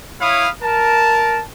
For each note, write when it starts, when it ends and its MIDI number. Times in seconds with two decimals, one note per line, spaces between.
0.21 0.49 64
0.21 0.49 73
0.21 0.49 77
0.21 0.49 83
0.21 0.49 87
0.63 1.43 70
0.63 1.43 81